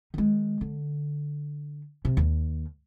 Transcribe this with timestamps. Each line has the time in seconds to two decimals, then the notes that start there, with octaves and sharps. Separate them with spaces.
0.14 D#3 G#3
0.61 D3
2.05 C3
2.17 D#2